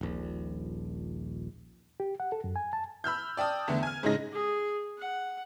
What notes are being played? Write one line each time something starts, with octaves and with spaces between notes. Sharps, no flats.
D#1 A#1
G4
F#5
A4
F#2
G#5
A5
B5 E6 F6 G6
D5 G5 A5 D#6
E2 D3 A3
G#5 F6
G#2 C#3 G#3 D#4 A#6
G#4
F#5